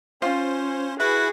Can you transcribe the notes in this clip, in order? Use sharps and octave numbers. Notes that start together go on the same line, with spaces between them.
C#4 F4 C5
E4 F#4 G#4 B4